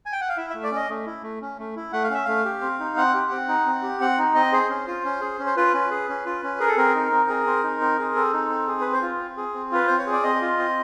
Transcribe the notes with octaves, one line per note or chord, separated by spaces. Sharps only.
G#5
G5
F#5
F5
E4 E5
A3 E5
D5
C#4 D#5
A3
E4
A3
C#4
A3
E4
A3 F#5
F5
C#4 E5
A3 F5
G4
C4
D#4
C4 F#5
G4
C4
D#4
C4
G4
C4 F#5
D#4
C4 D#5
G#4 C5
C#4
F4
C#4
G#4
C#4
C5
F4 B4
C#4
G#4
C#4
F4
C#4
G#4 A#4
A4
C4 A#4
D#4
C4
G#4
C4
D#4
C4
G#4
C4 A4
D#4
C4
G#4
C4 B4
C5
F4
C4
G#4
C4
F4 B4
C4 C5
C#5
G#4
D5
C4 D#5
F4
C4